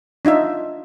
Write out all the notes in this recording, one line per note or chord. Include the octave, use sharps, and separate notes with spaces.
D4 D#4 F4 E5